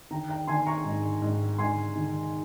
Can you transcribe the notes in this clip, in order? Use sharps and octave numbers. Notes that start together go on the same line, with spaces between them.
D#3 G5 A#5
G5 A#5
D#3 G#5 C6
A#5 C#6
G#2
G#2
G#2 G#5 C6
D#3